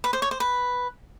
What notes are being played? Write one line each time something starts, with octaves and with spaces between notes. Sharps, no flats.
B4
C5
C#5
C5
B4